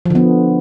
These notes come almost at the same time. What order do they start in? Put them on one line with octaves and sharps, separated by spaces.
F3 D3 B3